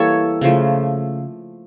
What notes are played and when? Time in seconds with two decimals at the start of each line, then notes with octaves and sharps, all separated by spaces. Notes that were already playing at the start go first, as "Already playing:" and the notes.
Already playing: E3 G3 A#3 A4 C#5
0.41 C#3 F3 A3